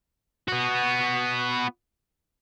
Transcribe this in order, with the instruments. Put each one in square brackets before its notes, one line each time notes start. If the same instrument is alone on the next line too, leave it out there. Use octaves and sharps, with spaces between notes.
[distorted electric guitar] B3 F#4